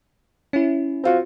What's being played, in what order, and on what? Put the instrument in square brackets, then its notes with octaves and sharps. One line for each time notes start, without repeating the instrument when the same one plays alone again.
[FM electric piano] C#4 E4
[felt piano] C4 F4 F#4